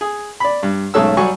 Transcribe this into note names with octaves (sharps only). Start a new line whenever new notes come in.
G#4
D5 B5
G2
B1 G#2 A3 C#4 A5 E6
F#3 G3 F#4 G#5 C#6